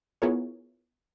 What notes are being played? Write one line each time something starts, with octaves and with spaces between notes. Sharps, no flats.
B3 E4 F4 G#4 A#4 C#5